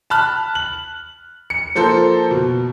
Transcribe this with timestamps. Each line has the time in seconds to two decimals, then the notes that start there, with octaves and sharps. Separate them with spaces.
0.10 A5 B5 F6 F#6
0.55 F#7
1.50 C#7
1.75 F3 A#3 A4 C5 G6
2.31 B2